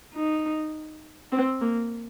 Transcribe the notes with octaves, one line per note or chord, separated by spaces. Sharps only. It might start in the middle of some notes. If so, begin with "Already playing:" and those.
D#4
C4
A#3